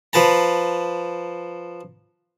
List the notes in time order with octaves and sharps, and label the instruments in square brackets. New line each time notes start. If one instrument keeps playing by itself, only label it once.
[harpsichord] F3 B4 A5 A#5